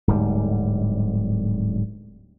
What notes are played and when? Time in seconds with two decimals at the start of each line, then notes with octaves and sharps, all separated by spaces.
0.08 D1 G#2 G3